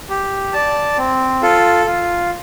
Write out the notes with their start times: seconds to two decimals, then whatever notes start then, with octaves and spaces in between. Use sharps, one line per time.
0.10 G4
0.53 D5 A5
0.98 C4
1.42 F4 A4
1.86 F4